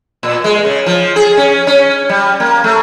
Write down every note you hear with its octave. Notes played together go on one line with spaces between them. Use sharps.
A#2
G#3
C#3
F3
G#4
C#4
C#4
G3
A#3
A3